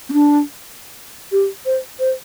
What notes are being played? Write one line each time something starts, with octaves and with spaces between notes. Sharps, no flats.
C4
D4
G4
C5
C5